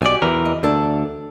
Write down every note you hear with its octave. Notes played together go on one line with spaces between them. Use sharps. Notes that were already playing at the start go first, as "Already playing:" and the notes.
B1 F#4 G4 D5 G#5
E2 E3 A#4
D#5
D2 D4 A4